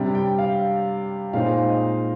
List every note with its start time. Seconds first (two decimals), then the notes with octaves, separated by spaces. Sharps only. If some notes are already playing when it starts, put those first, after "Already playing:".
Already playing: C3 G3 D4
0.15 G5
0.38 F5
1.33 A#2 G#3 C4 D#4 F5
1.69 D#5